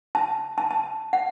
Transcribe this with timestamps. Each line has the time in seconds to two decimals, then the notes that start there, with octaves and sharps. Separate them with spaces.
0.15 A5
0.58 A5
0.71 A5
1.13 F#5